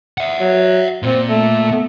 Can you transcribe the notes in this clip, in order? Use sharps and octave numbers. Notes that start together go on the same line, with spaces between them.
E5 F#5
F#3
A#2 A#3 C4
A3